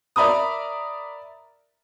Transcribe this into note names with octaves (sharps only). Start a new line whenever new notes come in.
A#4 D5 E5 A#5 B5 D#6